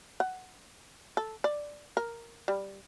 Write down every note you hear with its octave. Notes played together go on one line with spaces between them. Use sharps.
F#5
A4
D5
A#4
G3